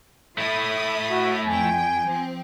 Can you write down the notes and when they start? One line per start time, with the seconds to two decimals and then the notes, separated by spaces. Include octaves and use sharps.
0.38 A3 E4 E5 B5 D#6
1.10 F#4
1.46 F2 G5 G#5
2.08 F3 C4